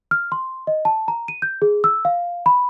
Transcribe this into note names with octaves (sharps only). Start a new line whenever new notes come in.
F6
C6
D#5
A5
A#5
D#7
G6
G#4
E6
F5
B5